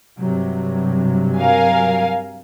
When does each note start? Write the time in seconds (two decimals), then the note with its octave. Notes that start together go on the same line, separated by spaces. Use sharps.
0.19 G2 C3 F#3
1.37 A#4 F5 G#5